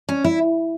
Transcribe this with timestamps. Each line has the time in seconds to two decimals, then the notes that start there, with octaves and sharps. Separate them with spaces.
0.09 C#4
0.24 E4